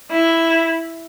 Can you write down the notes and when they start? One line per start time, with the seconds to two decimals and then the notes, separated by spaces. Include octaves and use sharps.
0.11 E4